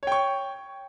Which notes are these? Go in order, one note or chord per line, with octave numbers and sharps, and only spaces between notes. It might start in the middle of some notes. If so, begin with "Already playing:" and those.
C#5 G5 C#6